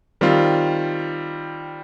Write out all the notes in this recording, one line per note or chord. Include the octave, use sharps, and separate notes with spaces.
D#3 G3 C4 F4